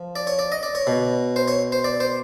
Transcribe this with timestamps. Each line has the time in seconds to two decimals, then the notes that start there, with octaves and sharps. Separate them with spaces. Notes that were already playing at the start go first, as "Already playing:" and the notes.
Already playing: F3
0.16 D5
0.27 C#5
0.39 D5
0.52 D#5
0.63 D5
0.75 C#5
0.87 B2
1.36 C5
1.48 C#5
1.72 C5
1.84 D5
2.00 C5